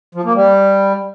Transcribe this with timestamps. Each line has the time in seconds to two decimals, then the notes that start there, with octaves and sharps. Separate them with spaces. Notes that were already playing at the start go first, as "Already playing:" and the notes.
0.15 F3
0.25 A#3
0.35 G3